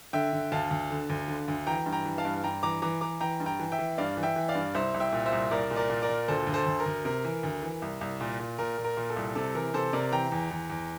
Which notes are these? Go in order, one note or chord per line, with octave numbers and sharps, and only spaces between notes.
D3 E5 G5
D3
D2 F5 A5
D2
D3
D2
D3
D2
E3 G5 A#5
G2
G5 A#5
E3
F5 A5
G2
G2 G5 A#5
E3 A#5 D6
E3 A#5 D6
E3 A#5 D6
E3 G5 A#5
G2
G5 A#5
E3
E5 G5
E3
G2 D5 F5
E3
E5 G5
E3
D5 F5
G2
C2 C5 E5
C2
E5 G5
A#2
C5 E5
C2
C2 A#4 D5
A#2
A#4 D5
A#2
A#4 D5
A#2
D2 A4 C5
D2
A4 C5
D2
A#4
D2
C3 A#4
E3
D2
E3
C2
C2
A#2
A#2
A#2 A#4
A#2
A#4
A#2
A4
C2
C3 A4
E3 A#4
C3 A4 C5
C3 A#4 D5
E3 G5 A#5
E2
E2
E2